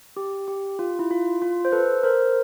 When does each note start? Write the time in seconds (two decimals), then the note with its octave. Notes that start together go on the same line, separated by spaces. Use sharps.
0.17 G4
0.48 G4
0.79 F4
0.99 E4
1.11 F4
1.42 F4
1.65 C5
1.72 A4 B4
2.03 A#4 C5